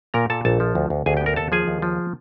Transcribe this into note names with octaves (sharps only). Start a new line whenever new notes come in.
A#2 A#4 A#5
A#2 A4 A5
A#1 A4 A5
F3
D2
D2
D2 G#4 G#5
G4 G5
B3
A#4 A#5
D#2 A4 A5
F3 G#4 G#5
D#2
F3